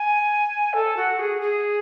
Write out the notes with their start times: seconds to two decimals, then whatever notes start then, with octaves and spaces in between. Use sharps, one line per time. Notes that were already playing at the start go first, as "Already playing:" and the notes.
Already playing: G#5
0.73 A4
0.96 F#4
1.19 G#4
1.41 G#4